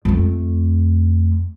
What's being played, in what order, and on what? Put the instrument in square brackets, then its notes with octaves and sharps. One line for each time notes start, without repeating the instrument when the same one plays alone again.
[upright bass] F2 A3